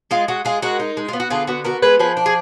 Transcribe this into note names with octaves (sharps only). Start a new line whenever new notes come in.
G#3 F4
G#3 F#4
G#3 F4 G#4
G#3 F#4 A#4
D#4
G#3
B3 F4
F#4
D3 F4 G#4
B3 F#4
B3 F#4 A#4
G#3 G#4 B4
F3 G#4 B4
D4
G#4